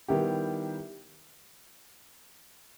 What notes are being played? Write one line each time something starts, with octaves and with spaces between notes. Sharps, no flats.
D#3 G3 B3 E4 G4